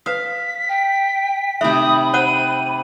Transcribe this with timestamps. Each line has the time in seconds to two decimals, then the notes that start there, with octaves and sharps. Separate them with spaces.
0.06 B4 F5 D#6 B6
0.68 G5
1.61 C3 D#3 A3 E5 B5 D#6
2.14 C5 F#5 G5 D#6 D#7